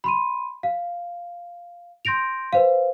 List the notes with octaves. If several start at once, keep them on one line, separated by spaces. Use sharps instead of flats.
B5 C6 D#7
F5
C6 G6 A#6 D7 F7
B4 C5 F5